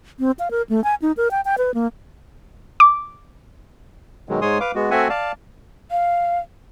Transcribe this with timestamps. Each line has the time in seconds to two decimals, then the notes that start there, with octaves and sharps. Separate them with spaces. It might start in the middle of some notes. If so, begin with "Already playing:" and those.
0.19 C4
0.39 F5
0.51 A#4
0.69 A3
0.84 G#5
1.02 D#4
1.17 A#4
1.31 G5
1.45 G5
1.58 B4
1.74 A#3
2.80 D6
4.29 B2 D#3 F#3 G#3
4.41 G#2 G#3 C#5 G#5 C6 D#6
4.60 B4 F5 D6
4.75 G#3 B3 F#4
4.91 A3 C4 F#4 E5 F#5 G#5
5.10 D5 F5 A5
5.91 F5